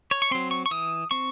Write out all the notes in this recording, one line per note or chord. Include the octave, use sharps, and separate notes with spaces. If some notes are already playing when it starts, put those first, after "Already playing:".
C#5
C#6
F#3 C4 C6
C#6
C#6
E3 D#6
C4 C#6